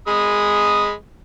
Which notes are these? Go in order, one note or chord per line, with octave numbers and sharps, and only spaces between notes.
G#3 B5 D#6